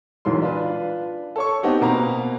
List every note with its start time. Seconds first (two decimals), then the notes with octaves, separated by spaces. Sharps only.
0.25 E1 B1 C6
0.42 D4 F4 B4
1.36 A4 C#5 C#6
1.63 B3 C4 D#4 G4
1.81 B2 A#3 C4 A#5 B5